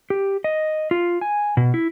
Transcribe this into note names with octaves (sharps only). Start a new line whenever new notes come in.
G4
D#5
F4
G#5
B2
E4